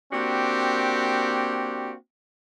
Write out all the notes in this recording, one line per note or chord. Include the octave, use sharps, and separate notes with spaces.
A#3 C4 D4 F#4 G4